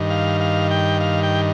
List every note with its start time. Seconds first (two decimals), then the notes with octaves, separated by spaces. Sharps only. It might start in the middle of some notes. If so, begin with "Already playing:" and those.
Already playing: G2 D#3
0.10 F5
0.41 F5
0.71 G5
1.00 F5
1.23 G5